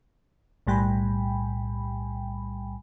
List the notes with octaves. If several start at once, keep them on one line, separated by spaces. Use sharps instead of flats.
B1 A2 G3 G5 G#5 B5